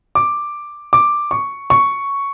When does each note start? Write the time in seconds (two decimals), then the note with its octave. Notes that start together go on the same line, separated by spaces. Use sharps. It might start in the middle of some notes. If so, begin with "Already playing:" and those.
0.15 D6
0.93 D6
1.31 C#6
1.70 C#6